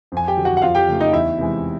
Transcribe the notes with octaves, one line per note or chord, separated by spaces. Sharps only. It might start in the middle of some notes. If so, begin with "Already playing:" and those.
F2 G#5
G4 G5
D3 F#3
F#4 F#5
F#5
F2 F4 F5
G4 G5
C#3 F3 A3
D#4 D#5
E2 E4 E5
C3 E3 G#3